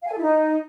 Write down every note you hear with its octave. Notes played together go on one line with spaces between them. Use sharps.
F5
G#5
A4
E4
D#4